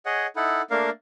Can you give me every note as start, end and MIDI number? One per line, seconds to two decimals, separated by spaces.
0.06 0.27 68
0.06 0.27 73
0.06 0.27 75
0.06 0.27 78
0.36 0.62 63
0.36 0.62 64
0.36 0.62 69
0.36 0.62 78
0.70 0.90 57
0.70 0.90 58
0.70 0.90 62
0.70 0.90 70
0.70 0.90 77